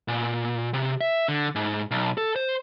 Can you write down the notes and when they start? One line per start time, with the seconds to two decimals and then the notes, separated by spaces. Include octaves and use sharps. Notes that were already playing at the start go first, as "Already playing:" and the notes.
0.08 A#2
0.73 C3
1.01 E5
1.28 D3
1.55 G#2
1.91 B1
2.18 A4
2.36 C5